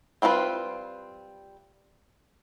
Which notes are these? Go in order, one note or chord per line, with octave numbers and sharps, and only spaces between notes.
G3 C4 F4 F#4 B4